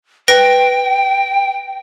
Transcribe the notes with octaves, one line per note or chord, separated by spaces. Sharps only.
B4 G5 A#6 D7